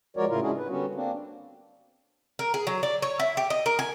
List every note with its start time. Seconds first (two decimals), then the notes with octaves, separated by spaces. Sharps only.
0.17 F3 G#3 F#4 A#4 C#5 D5
0.29 A2 C#3 E4 F4 A#4
0.42 G#3 C#4 D4 E4 F#4 G#4
0.57 B4
0.69 D3 G3 B3 C#4 F#4
0.95 A#3 C4 D4
2.39 A#4
2.54 G#4
2.67 F#3
2.83 D5
3.02 C#5
3.20 E4
3.37 G4
3.50 D#5
3.66 A#4
3.79 G#5